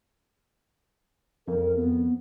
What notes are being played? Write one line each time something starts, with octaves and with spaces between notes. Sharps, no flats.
F2 A#4
B3